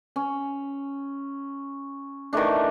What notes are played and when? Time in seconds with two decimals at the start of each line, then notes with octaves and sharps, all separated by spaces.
0.16 C#4
2.33 D#3 E3 A3 D4